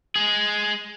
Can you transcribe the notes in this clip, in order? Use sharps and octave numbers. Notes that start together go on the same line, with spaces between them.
G#3 G#4